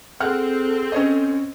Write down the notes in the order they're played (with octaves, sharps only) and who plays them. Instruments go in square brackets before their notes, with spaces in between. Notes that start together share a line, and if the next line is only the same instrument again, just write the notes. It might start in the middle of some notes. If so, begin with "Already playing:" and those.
[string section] C4 [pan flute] G#4 [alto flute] A4 [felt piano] F#5 F6
[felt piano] C#4 C#5 D#5